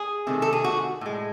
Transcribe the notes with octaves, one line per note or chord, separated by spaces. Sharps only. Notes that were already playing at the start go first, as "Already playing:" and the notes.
Already playing: G#4
C3 D#3 A3
A4
G#4
F#4
A2 G#3